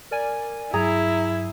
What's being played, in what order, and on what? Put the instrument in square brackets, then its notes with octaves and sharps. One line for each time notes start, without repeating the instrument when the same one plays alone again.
[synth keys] A#4 D5 G#5
[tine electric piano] G2 F#3 [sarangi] E4 [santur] G#4 [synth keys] A#5